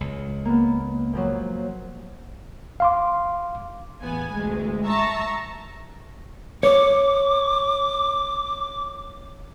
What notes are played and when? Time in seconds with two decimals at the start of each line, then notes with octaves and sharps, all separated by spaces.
0.01 C#2
0.45 A#3 B3
1.13 A#2 F3 F#3
2.80 F5 C6 D6
4.01 A1 E2 B3 G#5
4.31 A1 D2 G#3
4.86 E5 A5 A#5 C#6
6.63 C#5 D6